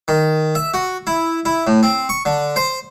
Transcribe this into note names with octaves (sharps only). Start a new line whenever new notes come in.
D#3
E5
F#4
E4
E4
A2
C4
C#6
D3
C5